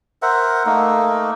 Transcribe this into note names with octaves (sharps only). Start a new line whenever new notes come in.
A#4 C5 E5 F#5
A3 A#3 D#4